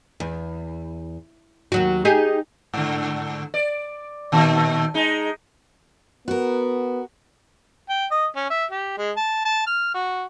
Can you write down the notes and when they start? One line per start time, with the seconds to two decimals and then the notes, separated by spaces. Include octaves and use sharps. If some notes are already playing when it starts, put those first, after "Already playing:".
0.20 E2
1.72 D#2 F#3 F#4
2.05 D#4 G4 G#4
2.74 G#2 D3
3.54 D5
4.32 A#2 D#3
4.94 G#3 D#4
6.28 B3 F#4 A#4
7.89 G5
8.11 D#5
8.36 C#4
8.50 E5
8.71 G4
8.98 G#3
9.17 A5
9.45 A5
9.67 F6
9.94 F#4